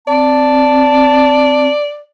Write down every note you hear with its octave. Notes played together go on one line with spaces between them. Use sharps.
C4 D5 A5